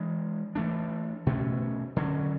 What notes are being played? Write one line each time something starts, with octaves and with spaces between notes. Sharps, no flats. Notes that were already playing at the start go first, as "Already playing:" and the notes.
Already playing: E3 G#3 D4
E3 A3 D4
B2 A3 C#4
D3 F#3 C#4